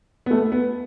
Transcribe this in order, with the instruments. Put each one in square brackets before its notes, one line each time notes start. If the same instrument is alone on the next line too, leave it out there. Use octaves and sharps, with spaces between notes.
[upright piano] B3
A3
B3